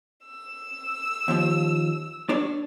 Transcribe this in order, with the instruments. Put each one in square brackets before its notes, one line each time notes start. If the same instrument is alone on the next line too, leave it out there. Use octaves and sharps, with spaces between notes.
[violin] E6
[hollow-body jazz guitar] D#2 F3
D4 C#5 D5